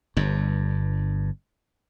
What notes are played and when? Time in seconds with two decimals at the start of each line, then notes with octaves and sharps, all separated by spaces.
0.17 G1 G2